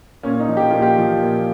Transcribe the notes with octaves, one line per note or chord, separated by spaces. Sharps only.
A#2 C#4
D#4
F3
G4
A#2 F4
G4
F3
A#2